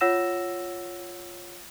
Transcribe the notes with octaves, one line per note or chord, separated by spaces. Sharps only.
F4 C#5 F#5 E6 A#6 E7